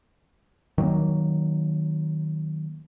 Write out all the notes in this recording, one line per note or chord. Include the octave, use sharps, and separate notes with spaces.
D#3 F#3 G3 A#3